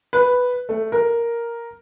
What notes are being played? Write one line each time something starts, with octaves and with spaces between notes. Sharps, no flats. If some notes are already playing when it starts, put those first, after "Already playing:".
B4
A3
A#4